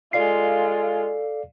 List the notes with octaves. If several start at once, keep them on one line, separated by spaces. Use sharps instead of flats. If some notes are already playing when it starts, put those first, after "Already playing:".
G#3 F4 A4 D5 F5 C7